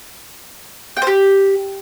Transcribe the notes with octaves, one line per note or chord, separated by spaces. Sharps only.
G5
C5
G4